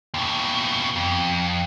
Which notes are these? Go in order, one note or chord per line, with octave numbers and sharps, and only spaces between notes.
D#2 B2
F2